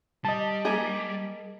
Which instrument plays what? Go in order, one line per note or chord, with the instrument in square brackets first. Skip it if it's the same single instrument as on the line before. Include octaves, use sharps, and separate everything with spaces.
[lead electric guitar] G3 [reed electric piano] D#5 A5
[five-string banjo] A#3 G#4